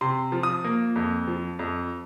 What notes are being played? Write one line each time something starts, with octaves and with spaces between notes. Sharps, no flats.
C3 C6
F3
D#6
A#3
F2
F3
F2